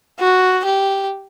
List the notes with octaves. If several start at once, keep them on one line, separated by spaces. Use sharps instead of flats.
F#4
G4